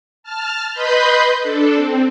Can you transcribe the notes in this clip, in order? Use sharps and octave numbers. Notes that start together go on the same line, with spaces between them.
A5 F6
B4 D#5 B5 C6 G6
D4 A4
C4